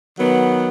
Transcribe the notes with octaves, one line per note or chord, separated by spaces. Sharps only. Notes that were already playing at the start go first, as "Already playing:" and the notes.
D#3 F#3 B3